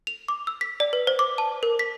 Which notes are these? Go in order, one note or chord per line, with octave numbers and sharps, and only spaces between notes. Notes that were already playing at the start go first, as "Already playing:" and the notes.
F7
D6
E6
B6
D5
B4
C5
D6
A5
A#4
B6